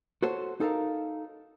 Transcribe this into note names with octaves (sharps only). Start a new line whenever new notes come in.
F#4 A4 C5 C#5
D#4 A4 A#4 F5